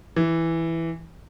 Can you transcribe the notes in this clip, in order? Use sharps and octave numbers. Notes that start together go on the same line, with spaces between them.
E3